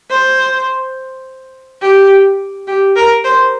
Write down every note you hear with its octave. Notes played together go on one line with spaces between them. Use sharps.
C5
G4
G4
A#4
C5